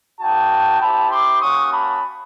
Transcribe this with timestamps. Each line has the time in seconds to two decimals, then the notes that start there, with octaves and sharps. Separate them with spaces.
0.21 A#3 D#4 F#4 G5 A5
0.81 C4 E4 G4 A5 B5
1.11 C6 D6
1.42 A#3 C#4 F#4 C#6 D#6
1.72 A5 B5